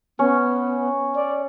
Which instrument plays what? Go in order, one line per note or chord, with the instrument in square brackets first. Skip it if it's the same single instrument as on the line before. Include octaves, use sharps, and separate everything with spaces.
[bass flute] B3 [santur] C#4
[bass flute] D5